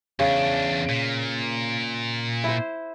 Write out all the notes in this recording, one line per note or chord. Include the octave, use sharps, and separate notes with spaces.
E2 C#3 D4
A#2
E4 C5